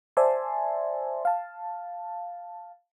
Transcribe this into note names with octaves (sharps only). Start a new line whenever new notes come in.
C5 D5 E5 G#5 A5 C6
F5 A5